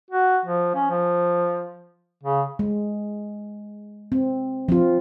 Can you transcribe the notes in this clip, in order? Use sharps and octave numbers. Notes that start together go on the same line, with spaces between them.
F#4
F3
C#4
F3
C#3
G#3
C4
F3 C4 F4